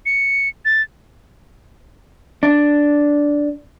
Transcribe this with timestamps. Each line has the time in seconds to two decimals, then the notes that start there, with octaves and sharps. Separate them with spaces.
0.06 C#7
0.65 A6
2.43 D4